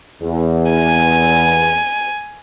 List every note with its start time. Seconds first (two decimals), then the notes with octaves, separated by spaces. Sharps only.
0.22 E2
0.71 G#5